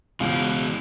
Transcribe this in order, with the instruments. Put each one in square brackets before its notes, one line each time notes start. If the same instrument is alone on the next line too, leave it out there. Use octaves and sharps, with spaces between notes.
[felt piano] C#2 [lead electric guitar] B2 E3